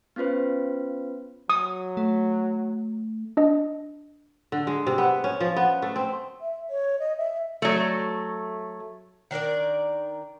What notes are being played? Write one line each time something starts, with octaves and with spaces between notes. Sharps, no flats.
B3 C#4 F4 B4 C5
F#3 D#6
A3
D4 D#5
D3
G#3
C3
B3
C#4
F3
B3
A3
C4
E5
C#5
D#5
E5
F#3 A3
D#3 D4 A#4 D5